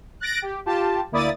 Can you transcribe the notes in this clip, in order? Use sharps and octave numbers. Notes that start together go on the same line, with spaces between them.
F#6 A6 A#6 D7
G4
F4 G4 A5
D2 A#3 E4 D5 D#6 A6